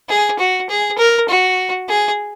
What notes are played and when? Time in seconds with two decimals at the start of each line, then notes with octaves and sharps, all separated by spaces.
0.09 G#4
0.39 F#4
0.69 G#4
0.98 A#4
1.28 F#4
1.88 G#4